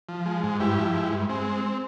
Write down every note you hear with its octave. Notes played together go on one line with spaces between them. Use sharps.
F3
G#3
G#2
G2 E4 G4
F3
G#3
G2
G#3 C4